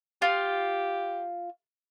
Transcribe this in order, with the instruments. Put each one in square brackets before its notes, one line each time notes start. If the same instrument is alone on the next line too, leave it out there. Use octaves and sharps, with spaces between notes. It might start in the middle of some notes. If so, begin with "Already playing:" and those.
[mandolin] F4 [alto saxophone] G4